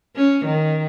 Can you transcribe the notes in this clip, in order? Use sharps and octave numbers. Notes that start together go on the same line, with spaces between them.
C#4
D#3